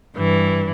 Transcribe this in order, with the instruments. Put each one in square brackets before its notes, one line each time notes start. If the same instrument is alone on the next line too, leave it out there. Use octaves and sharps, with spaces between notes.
[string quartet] G2 E3